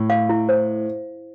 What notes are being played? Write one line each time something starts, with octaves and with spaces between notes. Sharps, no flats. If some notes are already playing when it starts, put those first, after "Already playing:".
Already playing: A2
F5
E4
C5